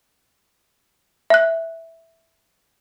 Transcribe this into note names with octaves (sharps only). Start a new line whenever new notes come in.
E5 F#6